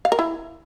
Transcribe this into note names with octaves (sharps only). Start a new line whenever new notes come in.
F5
A#4
E4